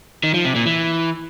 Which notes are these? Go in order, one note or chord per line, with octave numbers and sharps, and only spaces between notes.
D#3
F3
C3
A#2
E3